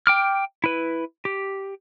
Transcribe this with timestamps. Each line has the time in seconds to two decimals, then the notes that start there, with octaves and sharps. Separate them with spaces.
0.07 G5 D6 F6
0.64 E4 B4
1.25 G4